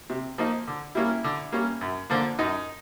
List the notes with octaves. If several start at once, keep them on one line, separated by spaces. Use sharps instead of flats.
C3
F3 A#3 D#4
D3
G3 A#3 C#4 E4
D3
G3 A#3 C#4
F#2
D3 F3 A#3
F#2 D#4